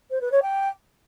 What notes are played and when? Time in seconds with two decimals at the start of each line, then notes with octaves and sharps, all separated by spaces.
0.10 C5
0.21 B4
0.31 C#5
0.42 G5